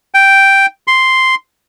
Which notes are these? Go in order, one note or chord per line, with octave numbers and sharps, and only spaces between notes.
G5
C6